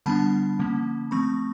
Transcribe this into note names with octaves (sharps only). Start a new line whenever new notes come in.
D3 G3 B3 D4 A5 B5
D3 F3 A#3 C#4
F3 A3 C4 B5 C#6